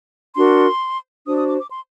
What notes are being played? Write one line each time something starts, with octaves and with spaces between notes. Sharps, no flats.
D4 F#4 A#4 C6
D4 F#4 C5 D#6
D#6
D6
D6
C6